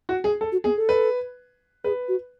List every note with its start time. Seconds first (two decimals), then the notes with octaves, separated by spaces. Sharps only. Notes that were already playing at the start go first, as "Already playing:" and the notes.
0.09 F#4
0.24 G#4
0.41 A4
0.52 F#4
0.64 B3 G#4
0.76 A4
0.89 B4
1.84 G#4 B4
2.08 F#4